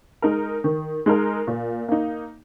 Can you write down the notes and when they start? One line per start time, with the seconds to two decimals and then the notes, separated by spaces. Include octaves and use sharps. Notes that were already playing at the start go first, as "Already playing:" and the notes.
0.22 G#3 D#4 A#4
0.64 D#3
1.06 G#3 D#4 A#4
1.47 A#2
1.88 A#3 D#4